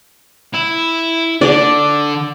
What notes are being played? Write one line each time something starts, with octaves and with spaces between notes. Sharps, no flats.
E4
D3 D5